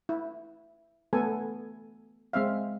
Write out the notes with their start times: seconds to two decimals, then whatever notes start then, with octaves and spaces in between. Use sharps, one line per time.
0.09 E4
1.13 A3 B3 A4 B4 G#5
2.33 G#3 C4 E5 F5